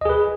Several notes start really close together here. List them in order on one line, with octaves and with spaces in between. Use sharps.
D#5 G#4 B4